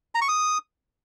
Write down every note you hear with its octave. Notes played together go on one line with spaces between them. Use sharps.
A#5
C#6
D#6